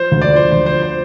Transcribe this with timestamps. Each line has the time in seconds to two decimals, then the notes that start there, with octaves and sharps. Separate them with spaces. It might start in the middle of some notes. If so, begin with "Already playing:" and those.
Already playing: F3 C5
0.12 D2
0.22 D5
0.32 F3 C5
0.51 D2 C5
0.66 C5
0.72 F3
0.82 C5